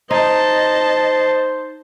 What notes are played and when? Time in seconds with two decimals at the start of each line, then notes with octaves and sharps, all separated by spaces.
0.11 D#4 C5 D#5 A5